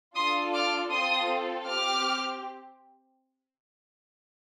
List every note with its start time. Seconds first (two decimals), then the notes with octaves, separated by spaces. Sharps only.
0.15 D4 F4 A4 C6 D#6
0.54 D6 F6
0.91 C4 F4 A4 C6 D#6
1.67 C4 G4 D6 F6